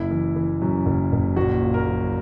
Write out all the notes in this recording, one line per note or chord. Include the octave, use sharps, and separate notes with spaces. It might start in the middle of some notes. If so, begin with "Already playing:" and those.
Already playing: F#1 E4
E3
E3
F#2
F#1
F#1
A#1 F#4
A#2
A#4
F#3